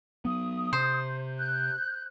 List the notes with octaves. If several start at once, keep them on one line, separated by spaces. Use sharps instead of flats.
F#3 B3 D#6
C3 C5
F#6 G6